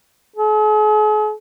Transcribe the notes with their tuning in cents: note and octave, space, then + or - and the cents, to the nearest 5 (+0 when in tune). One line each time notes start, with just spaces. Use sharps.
G#4 +45